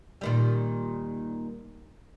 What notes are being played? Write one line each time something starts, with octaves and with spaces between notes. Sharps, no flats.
A#2 D#3 G3